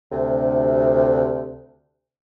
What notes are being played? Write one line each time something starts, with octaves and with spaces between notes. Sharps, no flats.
D2 C3